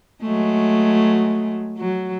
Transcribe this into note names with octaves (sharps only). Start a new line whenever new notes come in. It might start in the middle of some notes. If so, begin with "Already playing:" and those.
F#3 G#3 A3
F#3